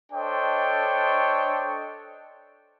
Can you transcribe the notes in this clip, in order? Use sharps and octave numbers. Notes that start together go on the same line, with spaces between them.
D4 A4 C5 C#5 D#5 G5